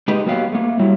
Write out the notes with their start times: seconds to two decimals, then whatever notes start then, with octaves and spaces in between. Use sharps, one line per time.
0.08 G#3 D#4 G4 B4 D#5
0.26 F#3 A#3 B3 G4 B4 F5
0.52 A3 A#3
0.79 F#3 G3 E4